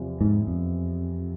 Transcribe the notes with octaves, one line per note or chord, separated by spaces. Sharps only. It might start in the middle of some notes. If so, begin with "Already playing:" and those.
Already playing: E2 C3 F3
G#2
F2